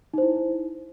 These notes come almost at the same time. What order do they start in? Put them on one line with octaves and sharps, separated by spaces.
D#4 C5 E4